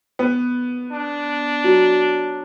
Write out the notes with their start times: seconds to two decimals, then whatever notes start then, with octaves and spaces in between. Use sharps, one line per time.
0.19 B3
0.92 D4
1.64 F#3